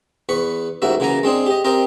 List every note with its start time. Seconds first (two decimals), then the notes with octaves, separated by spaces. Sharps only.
0.29 E2 B4 B5 C#6
0.82 A1 G#2 A#3 F#4 E5
1.00 C#3 E3 F#3 A#3 G#5 A#5
1.23 G#3 C4 D4 G#4
1.46 G4 D#5
1.64 C4 G4 A#4 D#5 G5